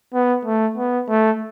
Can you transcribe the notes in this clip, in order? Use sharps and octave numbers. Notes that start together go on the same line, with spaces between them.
B3
A3
B3
A3